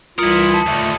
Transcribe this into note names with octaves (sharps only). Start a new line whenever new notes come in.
C2 E3 E4 F4 A#4 D#6 C#7 F#7
A5
D#2 A#2 D3 A3